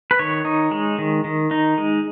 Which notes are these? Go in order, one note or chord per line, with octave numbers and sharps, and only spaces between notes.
B4
D#3 C#5
D#4
G#3
D#3
D#3
D#4
G#3